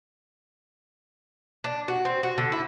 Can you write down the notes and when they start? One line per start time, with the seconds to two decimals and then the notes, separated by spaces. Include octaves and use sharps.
1.64 D4
1.88 F#4
2.05 C4
2.23 F#4
2.38 D3
2.52 E4